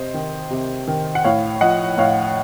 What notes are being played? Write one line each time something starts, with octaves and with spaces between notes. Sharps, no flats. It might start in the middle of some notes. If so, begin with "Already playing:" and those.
Already playing: C3 C5 D#5
D#3
C3
D#3
F#5
A2 C#5 F5
F3 D#5 F#5
A2 C#5 F5